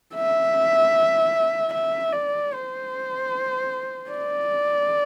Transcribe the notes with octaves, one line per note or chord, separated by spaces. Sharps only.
E5
E5
D5
C5
D5